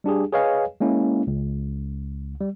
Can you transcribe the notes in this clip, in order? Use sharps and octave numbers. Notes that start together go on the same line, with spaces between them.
G3 D4 G4 G#4
G#4 B4 C#5 D#5 F5 G#5
G#3 A#3 C#4 E4
C#2
G3